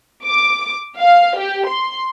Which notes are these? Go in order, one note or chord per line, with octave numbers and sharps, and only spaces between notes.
D6
F5
G4
C6